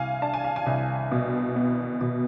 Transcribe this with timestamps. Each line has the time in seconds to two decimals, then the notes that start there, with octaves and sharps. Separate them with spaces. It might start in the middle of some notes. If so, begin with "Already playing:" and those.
Already playing: C2 F5 G#5
0.22 D4 A5
0.34 G#5
0.44 F5
0.56 G#5
0.66 C2
1.11 B2
1.56 B3
2.01 B2